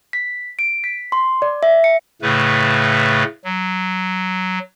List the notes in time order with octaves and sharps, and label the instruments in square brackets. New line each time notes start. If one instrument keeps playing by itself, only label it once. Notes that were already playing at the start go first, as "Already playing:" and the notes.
[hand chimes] B6
D7
B6
C6
D5
E5
C#7
[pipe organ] A2 C#3 A3 B4
F#3